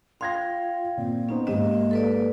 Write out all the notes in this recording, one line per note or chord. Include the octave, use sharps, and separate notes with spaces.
F4 F5 G5 C6 G#6 A#6
A#2 C4
B3 C#4 D#4 C5
G#2 A#3 G4 D#5 E7
A4 B4 D5